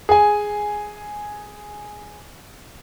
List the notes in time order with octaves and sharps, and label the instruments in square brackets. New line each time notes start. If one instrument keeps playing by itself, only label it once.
[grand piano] G#4 G#5